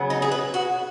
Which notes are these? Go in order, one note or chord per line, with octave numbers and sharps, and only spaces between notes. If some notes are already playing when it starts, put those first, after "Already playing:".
Already playing: C#3 F#3 B3
D#4
G#4
B4
F#4